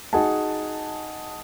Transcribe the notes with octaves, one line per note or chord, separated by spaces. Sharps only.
D#4 F#4 G#4 F#5 G#5 A5